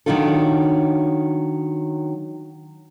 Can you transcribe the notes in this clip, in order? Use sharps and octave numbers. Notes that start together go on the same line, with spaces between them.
D#3 F#3 D4 D#4 F4 A4